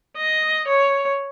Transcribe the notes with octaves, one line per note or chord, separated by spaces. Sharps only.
D#5
C#5